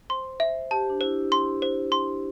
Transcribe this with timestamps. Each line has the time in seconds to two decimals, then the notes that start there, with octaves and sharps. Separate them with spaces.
0.09 C5 C6
0.40 C5 E5
0.71 G4 A5
0.90 D4
1.01 E4 C5
1.32 C6
1.62 C5
1.92 C6